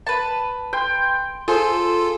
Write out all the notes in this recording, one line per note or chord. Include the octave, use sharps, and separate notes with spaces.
B4 A5
G5 C6
F4 G#4 A4 C5